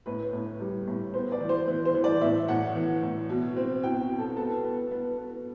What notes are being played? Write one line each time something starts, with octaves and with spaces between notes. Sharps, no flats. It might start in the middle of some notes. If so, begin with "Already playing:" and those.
A2 B4
A2
G3
A2
B3 C5
D5
E3
C5
E3
C5
E3
D5
A2 E5
A2 F#5
E3
A2
B2
C4
B2 G5
B2
A4
B3 A4
B3
B3
B3